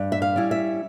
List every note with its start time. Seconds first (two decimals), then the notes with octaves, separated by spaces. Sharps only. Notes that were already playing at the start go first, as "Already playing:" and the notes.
Already playing: G2
0.12 E5
0.22 F5
0.36 G3 C#4 E4
0.51 E5